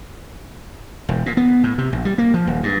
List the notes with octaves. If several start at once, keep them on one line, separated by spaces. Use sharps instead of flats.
E1
A#2
B3
A2
C3
A#1
G3
A#3
F3
D#1
G2